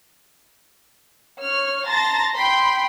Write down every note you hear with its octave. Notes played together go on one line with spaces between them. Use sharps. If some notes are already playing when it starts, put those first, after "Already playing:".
C#5 F6
A5 A#5 C6 A6 A#6
G5 B5 C6